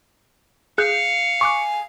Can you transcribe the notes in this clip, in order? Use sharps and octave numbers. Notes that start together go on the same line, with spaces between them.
G#4 F5 F#6 G6 C#7
G#5 C#6 D6 F#6